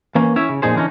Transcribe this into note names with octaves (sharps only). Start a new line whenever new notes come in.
E3 A#3 C#4
C#4 E4 C#5 E5
C#3
F2 A#2 D#4 G#4 C5
D3 E3 C#4 D#4